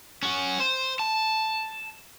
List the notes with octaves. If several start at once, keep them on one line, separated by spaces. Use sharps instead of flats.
C#4 F#4
C5
A5